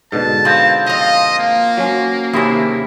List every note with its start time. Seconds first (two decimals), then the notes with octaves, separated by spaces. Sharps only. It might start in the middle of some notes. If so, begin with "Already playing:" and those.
0.12 G#2 B2 D3 A5
0.45 B3 C4 F4
0.86 F3 F4 D#5
1.39 A#3
1.78 F#3 C#4
2.33 D#2 C3 C#4 D4 E4 G#4